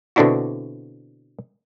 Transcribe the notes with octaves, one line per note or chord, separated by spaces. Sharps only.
B2 D3 C4 D4 E4 F#4